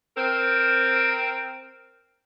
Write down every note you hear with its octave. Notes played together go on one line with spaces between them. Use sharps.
C4 A#4